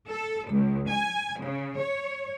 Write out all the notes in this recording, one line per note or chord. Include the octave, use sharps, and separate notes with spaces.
A4
C#2
G#5
C#3
C#5